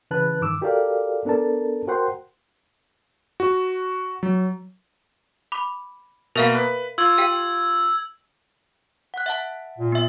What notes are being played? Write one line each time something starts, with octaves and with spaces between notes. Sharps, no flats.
C#3 E3 B4 A5 F#6
G2 D#3 D6 E6
F#4 G4 A4 A#4 D5 F5
B3 D4 A4 A#4 A5
F#4 A#4 C5 F#5 G5 C6
F#4
F#3
B5 D6
B2 A#3 A#4 E5 F5
B4
F4 E6 G#6
G4 F5 G5
F#5 F#6
E5 F#5 A5
A#2
B3 E5